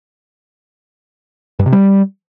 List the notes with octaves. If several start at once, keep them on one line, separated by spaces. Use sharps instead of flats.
G2
C3
G3